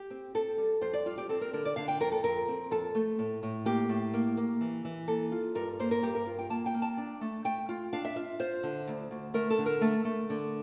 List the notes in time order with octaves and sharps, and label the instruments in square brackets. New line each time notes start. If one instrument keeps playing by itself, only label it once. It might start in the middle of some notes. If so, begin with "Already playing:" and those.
Already playing: [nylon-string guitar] G4
C4
C4 A4
G3
F2 C5
D5
G3 F4
G4
C4 A4
A#4
D3 A#4
D5
D3 F5
G5
F2 A#4
A4
F2 A#4
C4
F2 A4
A3
A2
A2
A#3 G4
A2
A#3
A#3
E3
E3
A#3 A4
F4
G2 A#4
A#3 C5
A#4
G2 G4
A#4
F4
G5
A#3 A5
G5
A#3
A5
D4
A3
A3 G5
F4
D4 F5
E5
F4 E5
F4 C5
D3
D2
D2
A3 A#4
A4
D3
A#4
A3
A3
D3